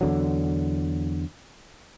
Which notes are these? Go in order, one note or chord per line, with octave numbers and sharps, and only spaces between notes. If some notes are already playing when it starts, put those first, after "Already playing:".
E2 D3 F#3